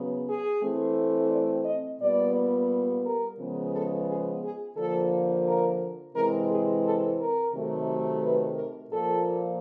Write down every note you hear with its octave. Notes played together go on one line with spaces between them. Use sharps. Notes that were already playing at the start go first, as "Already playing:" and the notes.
Already playing: C#3 F#3 B3
G#4
E3 A3 C4
D5
D#5
A#2 G3 B3 D5
A#4
C#3 F3 G#3 B3
A4
G#4
G#4
D3 F3 A#3 A4
A#4
C3 E3 G#3 C4 A#4
G#4
A4
A#4
C3 D#3 F#3 A3
B4
A#4
A#2 F3 A#3 A4